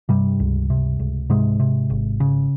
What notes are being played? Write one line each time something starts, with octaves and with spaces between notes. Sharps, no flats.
G2 C3 G3
C#2
C3
C#2
G#2 C3 G#3
C3
G#1
C#3